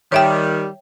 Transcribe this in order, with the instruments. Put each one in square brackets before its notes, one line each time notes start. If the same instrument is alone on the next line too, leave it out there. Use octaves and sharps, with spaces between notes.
[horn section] D#3 G3 [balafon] C#5 E5 G5